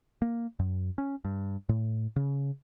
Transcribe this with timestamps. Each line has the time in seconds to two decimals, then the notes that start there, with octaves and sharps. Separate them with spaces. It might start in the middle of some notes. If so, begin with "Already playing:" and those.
0.22 A#3
0.59 F#2
0.98 C#4
1.25 G2
1.69 A2
2.16 C#3